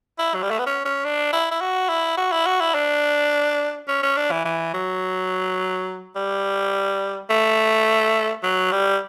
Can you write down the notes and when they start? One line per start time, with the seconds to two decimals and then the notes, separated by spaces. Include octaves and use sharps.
0.19 E4
0.35 F#3
0.42 G3
0.50 A3
0.59 B3
0.66 C#4
0.85 C#4
1.05 D4
1.33 E4
1.51 E4
1.61 F#4
1.89 E4
2.17 F#4
2.32 E4
2.46 F#4
2.61 E4
2.74 D4
3.88 C#4
4.02 C#4
4.17 D4
4.31 E3
4.45 E3
4.74 F#3
6.16 G3
7.30 A3
8.43 F#3
8.72 G3